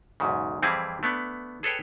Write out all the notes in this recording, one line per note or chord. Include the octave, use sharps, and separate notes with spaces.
B1 E2 G#2 C#3
F2 E3 G3 C4 E4 G#4
A3 B3 D4
G#4 A4 B4 C#5 G5